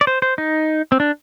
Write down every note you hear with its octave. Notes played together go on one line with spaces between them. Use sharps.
D5
C5
C5
D#4
C4
D4